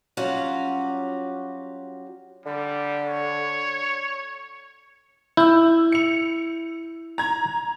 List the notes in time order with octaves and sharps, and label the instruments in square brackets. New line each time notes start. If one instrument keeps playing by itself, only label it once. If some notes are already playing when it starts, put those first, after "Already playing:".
[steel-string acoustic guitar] F#3 G3 C#4 F4 F#4 D5
[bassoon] D3 [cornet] G3
[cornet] C#5
[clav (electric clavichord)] E4 [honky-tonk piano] E6 G6
[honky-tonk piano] C#7 F7
A#5 G#6